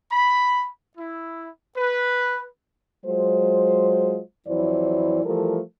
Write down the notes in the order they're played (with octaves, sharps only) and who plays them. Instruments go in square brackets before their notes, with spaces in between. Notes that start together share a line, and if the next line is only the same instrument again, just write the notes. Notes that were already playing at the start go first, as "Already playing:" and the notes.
[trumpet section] B5
E4
B4
[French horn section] F#3 G#3 F4 C5
F2 E3 F#3 E4 C5 D5
E3 F3 G3 A3 A4 A#4